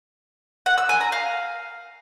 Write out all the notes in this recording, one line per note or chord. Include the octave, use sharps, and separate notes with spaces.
F#5
E6
G#5
A#5
F5